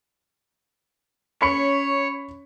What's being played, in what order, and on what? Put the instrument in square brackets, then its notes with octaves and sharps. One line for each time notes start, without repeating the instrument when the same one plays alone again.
[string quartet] C#4 [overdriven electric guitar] C#5 [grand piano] B5 C#6 C#7